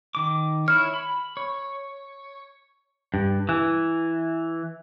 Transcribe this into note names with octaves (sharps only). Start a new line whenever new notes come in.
D#3 D6
E4 C#5 F6
B5
C#5
G2
E3